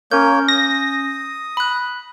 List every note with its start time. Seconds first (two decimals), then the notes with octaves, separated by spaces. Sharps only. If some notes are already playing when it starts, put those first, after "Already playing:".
0.12 A#3 C#4 A#4 C#5 G6
0.48 D#6 A#6
1.57 B5 F#6